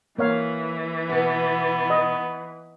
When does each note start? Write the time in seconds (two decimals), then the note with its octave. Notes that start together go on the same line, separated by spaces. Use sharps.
0.18 E3 A#3 C#5 F5
1.09 B2 B3 B4
1.90 D#5